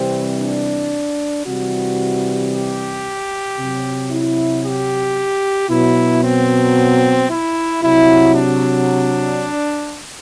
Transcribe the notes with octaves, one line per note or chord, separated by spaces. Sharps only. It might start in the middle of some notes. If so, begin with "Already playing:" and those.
Already playing: C3 E3 G3 C4
D4
C3 E3 G3 F#4
G4
C3 F#3
E4
G4
B2 F#3 E4
C4
E4
C3 F#3 E4
D4